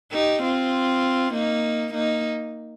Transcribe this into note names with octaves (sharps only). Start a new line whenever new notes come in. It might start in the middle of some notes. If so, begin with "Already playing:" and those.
D#4 G4
C4 F4
A#3 D#4
A#3 D#4